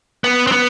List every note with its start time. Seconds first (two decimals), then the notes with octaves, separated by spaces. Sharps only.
0.24 B3
0.47 C4
0.52 B3